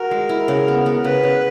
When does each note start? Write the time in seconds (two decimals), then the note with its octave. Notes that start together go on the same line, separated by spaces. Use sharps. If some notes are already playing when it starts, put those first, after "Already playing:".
Already playing: F#4 A#4
0.11 G#3
0.29 E4
0.48 C#3
0.68 B3
0.86 B3
1.04 C#3 B4
1.23 C#3